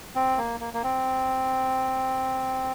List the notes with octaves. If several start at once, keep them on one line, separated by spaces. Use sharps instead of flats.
C4
A#3
A#3
A#3
C4